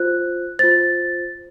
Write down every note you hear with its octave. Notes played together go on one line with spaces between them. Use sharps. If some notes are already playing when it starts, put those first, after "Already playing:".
Already playing: F4 C5 F#6
F4 C5 A6